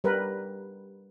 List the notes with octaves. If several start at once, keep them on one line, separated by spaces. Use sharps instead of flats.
G3 A#4 B4